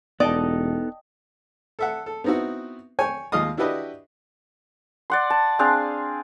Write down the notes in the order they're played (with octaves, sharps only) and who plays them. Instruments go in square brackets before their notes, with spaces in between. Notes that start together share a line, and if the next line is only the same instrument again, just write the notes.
[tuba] E1 [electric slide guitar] B3 D#4 A4 [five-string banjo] D5 [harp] D#5 G5 A5
[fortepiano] A4 E5 F#5
A4
B3 C4 D#4 E4 F#4
C#5 G5 G#5
D#2 G#3 F4 D#5 F5 D#6
D4 E4 F#4 G4 B4 D#5
[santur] D5 F#5 C6
A5
C4 D4 G#4 F5